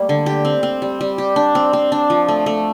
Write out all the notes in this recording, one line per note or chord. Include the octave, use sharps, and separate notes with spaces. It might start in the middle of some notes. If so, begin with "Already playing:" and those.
Already playing: G3 A3 A#3
D3
G4
C4
C4
G3
G3
G4
D4
C4
C4
D4
F3
A3
A3